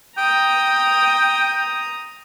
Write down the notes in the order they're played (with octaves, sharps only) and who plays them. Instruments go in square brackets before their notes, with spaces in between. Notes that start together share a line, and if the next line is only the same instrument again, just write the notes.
[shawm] G5 [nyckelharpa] A#5 D#6